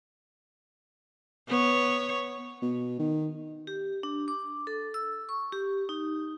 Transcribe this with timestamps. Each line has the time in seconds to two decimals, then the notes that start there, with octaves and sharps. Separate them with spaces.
1.48 B3 C#5
2.62 B2
2.99 D#3
3.67 G4
4.03 D4
4.28 D6
4.67 A4
4.94 E6
5.29 C#6
5.53 G4
5.89 D#4